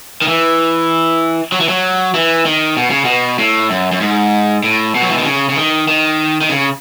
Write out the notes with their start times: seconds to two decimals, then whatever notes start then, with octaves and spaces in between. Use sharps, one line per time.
0.22 D#3
0.28 E3
1.52 F#3
1.60 E3
1.69 F#3
2.14 E3
2.46 D#3
2.77 B2
2.90 C#3
3.05 B2
3.39 A2
3.70 F#2
3.92 F#2
4.01 G#2
4.63 A2
4.95 B2
5.02 F#3
5.10 E3
5.18 D#3
5.25 C#3
5.49 C#3
5.56 D#3
5.88 D#3
6.41 D#3
6.50 C#3